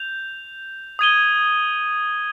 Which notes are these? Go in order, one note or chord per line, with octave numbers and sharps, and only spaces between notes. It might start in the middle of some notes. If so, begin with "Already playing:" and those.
Already playing: G6 F7
D#6 G#6 D#7 G7